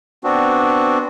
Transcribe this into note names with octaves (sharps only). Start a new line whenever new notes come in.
B3 C4 D4 F#4